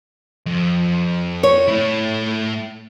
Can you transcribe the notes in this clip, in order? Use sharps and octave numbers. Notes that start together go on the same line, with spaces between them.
F2
C#5
A3 E4